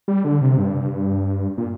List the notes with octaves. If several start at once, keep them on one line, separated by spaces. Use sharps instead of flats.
G3
D3
C3
G2
A#2